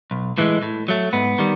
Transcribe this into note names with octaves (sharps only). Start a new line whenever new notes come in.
B1
A2 E3 G#3
A2
F#3 A3
G#2 B3
D#3 G3